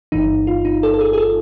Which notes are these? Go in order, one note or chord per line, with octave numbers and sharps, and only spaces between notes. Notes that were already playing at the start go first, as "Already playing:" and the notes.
G1 G2 E3 D#4
F4
D#4
A4
A4
G#4
G#4
A4